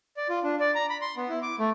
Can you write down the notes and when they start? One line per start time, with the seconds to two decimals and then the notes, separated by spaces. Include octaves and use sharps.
0.17 D5
0.29 F4
0.43 D4
0.60 D5
0.75 A#5
0.90 B5
1.01 C6
1.17 B3
1.29 E4
1.42 D6
1.59 A3